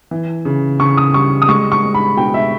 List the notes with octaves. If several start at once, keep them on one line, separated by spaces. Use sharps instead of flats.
E3
C#3
C#3 C#6
D#6
G3 C#6
D#6
G#3 C#6
C#6
G#3
B5
B2 G5
E5